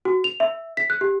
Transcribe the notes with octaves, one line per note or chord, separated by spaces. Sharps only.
F#4
F7
E5
B6
F#6
G4